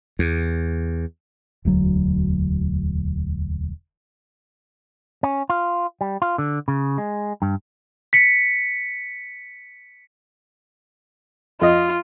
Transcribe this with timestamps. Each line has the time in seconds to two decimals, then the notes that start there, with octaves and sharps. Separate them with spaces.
0.19 E2
1.65 E1 D2 F#3
5.23 C#4
5.50 F4
6.01 G3
6.22 F4
6.38 D3
6.68 C#3
6.98 G#3
7.42 G2
8.13 B6 C#7
11.61 F2 F4 D#5